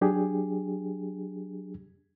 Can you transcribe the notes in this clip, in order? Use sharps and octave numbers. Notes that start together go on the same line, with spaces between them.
F#3 D4 G4 G#4